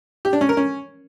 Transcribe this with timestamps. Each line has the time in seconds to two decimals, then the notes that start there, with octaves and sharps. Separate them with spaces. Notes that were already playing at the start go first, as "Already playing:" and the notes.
0.25 G4
0.33 D4
0.41 C#4
0.49 A#4
0.57 C#4